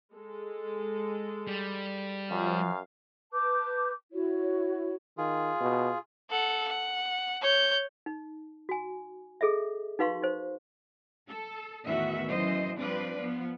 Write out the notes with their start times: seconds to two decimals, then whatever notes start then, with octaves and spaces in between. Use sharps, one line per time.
0.14 G#3 A4
1.48 G3
2.31 F#2 F3 F5
3.32 B4 A5 D6 G6
4.13 E4 F#4 C#5
5.18 D#3 F4 G#4
5.61 B2
6.30 A4 F#5
6.68 F#5
7.42 C#5 G6
8.06 D#4
8.69 F#4 G#5
9.41 G#4 A4 D#5 E5
9.99 D#4 F#4 B4 F5 C6 C#6
10.22 D#4 C5
11.29 A4
11.85 E2 A2 D#3 B3 F#4 E5
12.27 F#2 E3 C5 D#5
12.77 G2 F3 C4 D4 B4 D5
13.18 F3 B3